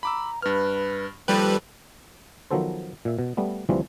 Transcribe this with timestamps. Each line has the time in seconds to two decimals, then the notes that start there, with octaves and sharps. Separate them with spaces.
0.03 A#5 B5 D6 E6
0.42 G2 B4 F6
1.28 D#2 F3 G3 A4 B4 G5
2.51 D#3 F3 F#3 B3 A4 C5
3.05 A#2 E5
3.19 B2
3.37 G3 A3 B3
3.69 D2 E3 F3 G3 C4